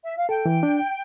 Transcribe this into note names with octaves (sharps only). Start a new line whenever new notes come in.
E5
F5
A4 G5
E3
D4